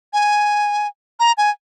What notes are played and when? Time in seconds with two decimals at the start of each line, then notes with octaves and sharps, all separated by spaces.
0.13 G#5
1.20 A#5
1.38 G#5